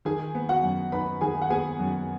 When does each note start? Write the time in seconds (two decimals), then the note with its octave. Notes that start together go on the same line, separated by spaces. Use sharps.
0.05 D#3 G#4 G#5
0.35 B3
0.49 F#4 F#5
0.63 F#2
0.92 D#4 B4 B5
1.21 D#3 G#4 G#5
1.42 F#5
1.50 B3 G#4 G#5
1.79 F#2